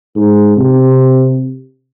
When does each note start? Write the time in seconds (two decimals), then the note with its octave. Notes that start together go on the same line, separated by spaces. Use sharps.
0.15 G#2
0.57 C3